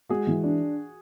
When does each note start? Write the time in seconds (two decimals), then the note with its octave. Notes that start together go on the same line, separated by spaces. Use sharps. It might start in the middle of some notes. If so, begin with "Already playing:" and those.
0.09 G#3 F#4 G#4
0.27 E3
0.43 D4